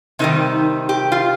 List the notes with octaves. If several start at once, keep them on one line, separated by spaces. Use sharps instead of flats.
C3 D#3 G3 D#4
G4
F4